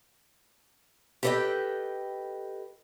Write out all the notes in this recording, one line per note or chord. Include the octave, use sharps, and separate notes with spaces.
G4 A4 B4 C5 D#5 G5